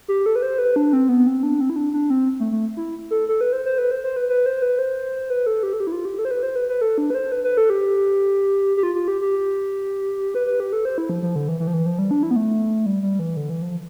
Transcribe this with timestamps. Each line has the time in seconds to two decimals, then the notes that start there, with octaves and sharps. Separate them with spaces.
0.08 G4
0.26 A4
0.36 B4
0.42 C5
0.58 B4
0.76 D4
0.93 C4
1.09 B3
1.27 C4
1.43 D4
1.60 C4
1.70 E4
1.76 D4
1.93 D4
2.10 C4
2.40 A3
2.52 A3
2.77 E4
3.11 A4
3.28 A4
3.41 B4
3.53 C5
3.66 C5
3.78 B4
3.91 C5
4.04 C5
4.16 B4
4.29 B4
4.46 C5
4.62 B4
4.79 C5
5.30 B4
5.46 A4
5.63 G4
5.73 A4
5.80 G4
5.87 E4
5.92 F4
6.05 G4
6.19 A4
6.25 C5
6.31 B4
6.43 C5
6.56 B4
6.69 B4
6.81 A4
6.98 D4
7.10 B4
7.15 C5
7.32 B4
7.44 B4
7.57 A4
7.70 G4
8.77 G4
8.83 F4
8.95 F4
9.08 G4
9.21 G4
10.34 B4
10.47 B4
10.60 G4
10.73 A4
10.85 C5
10.98 E4
11.09 F3
11.23 F3
11.36 D3
11.48 E3
11.60 E3
11.67 F3
11.73 E3
11.86 F3
11.99 G3
12.11 D4
12.23 E4
12.31 B3
12.36 A3
12.86 G3
13.03 G3
13.19 E3
13.37 D3
13.50 E3
13.62 F3